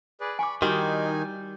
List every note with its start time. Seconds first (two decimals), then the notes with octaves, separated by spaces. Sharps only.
0.20 G#4 B4 D5
0.39 G#5 B5 C#6 D6
0.62 D#3 G3 D#4 E4 F#4 G#5